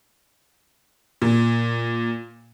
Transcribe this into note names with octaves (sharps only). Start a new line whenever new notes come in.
A#2